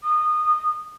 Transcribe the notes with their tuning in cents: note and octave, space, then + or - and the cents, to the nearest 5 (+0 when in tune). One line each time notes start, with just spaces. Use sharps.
D#6 -20